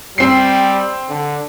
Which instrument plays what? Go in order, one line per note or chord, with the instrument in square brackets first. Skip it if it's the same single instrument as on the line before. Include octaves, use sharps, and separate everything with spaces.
[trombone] G3 [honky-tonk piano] C4 C7
[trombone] D3